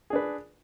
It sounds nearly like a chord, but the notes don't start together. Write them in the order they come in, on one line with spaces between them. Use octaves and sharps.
G#4 D4 B4